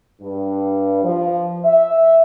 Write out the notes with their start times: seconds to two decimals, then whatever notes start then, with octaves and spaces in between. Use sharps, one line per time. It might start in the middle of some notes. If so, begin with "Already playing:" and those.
0.22 G2
1.04 F3
1.64 E5